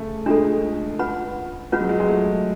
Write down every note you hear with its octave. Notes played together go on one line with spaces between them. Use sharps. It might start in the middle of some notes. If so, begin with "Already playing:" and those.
Already playing: C#3 A3
G#3 D4 F4 A4
C#4 F4 B4 F#5 B5
G#3 C#4 F4 B4 F#5 B5
F#3
G#3
G#3
A3